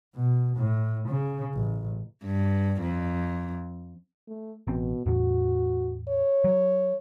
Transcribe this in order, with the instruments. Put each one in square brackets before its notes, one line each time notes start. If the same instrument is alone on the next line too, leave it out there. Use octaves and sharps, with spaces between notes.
[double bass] B2
A2
C#3
A1
[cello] G2
F2
[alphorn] A3
[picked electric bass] A1 C4 [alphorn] B2
[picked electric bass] E2 A2 [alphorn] F#4
[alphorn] C#5
[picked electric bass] F#3